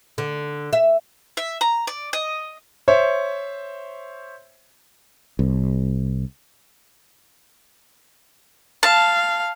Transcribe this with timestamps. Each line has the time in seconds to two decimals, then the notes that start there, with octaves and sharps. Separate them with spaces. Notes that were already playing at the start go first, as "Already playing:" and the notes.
0.18 D3
0.73 E5
1.37 E5
1.61 A#5
1.87 D5
2.13 D#5
2.88 C5 C#5 E5
5.39 C2
8.83 F5 A5